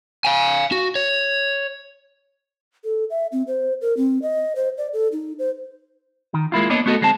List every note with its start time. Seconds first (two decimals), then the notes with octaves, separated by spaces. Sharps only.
0.25 F5 G#5
0.72 F#4
0.95 C#5
2.84 A4
3.10 E5
3.32 C4
3.47 C5
3.81 A#4
3.97 C4
4.22 D#5
4.56 C5
4.78 D5
4.93 A4
5.12 D#4
5.39 C5
6.34 D#3
6.52 G#3 A#3 E4 F4
6.70 A#3 B3 D4 C#5 D#5
6.86 A3 B3 F#4 A4 D#5
7.01 D2 G#3 C4 A5